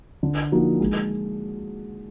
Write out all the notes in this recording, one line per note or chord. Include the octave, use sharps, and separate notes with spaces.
D3
F3 A#3 D#4 F#4
G#3